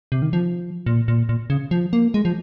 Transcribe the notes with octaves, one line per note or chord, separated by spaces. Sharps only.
C3
D#3
F3
A#2
A#2
A#2
C#3
F3
A#3
G#3
F3